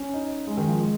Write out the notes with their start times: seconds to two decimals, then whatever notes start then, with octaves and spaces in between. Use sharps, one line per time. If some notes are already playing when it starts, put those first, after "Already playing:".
Already playing: C#4
0.14 D#4
0.47 G#3
0.57 D#3
0.68 F3
0.80 G#3